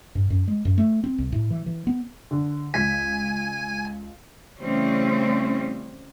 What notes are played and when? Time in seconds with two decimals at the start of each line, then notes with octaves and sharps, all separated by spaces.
0.15 G2
0.30 F#2
0.48 G#3
0.65 F#2
0.78 A3
1.04 C4
1.18 C2
1.32 A2
1.50 E3
1.66 E3
1.87 B3
2.31 D3
2.74 C#2 G#5 B6
4.59 C#3 E3 G3 A3 C4 C#4